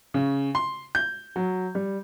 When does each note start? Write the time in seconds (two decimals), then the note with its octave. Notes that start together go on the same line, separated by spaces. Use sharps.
0.14 C#3
0.55 C6
0.95 G6
1.36 F#3
1.75 G3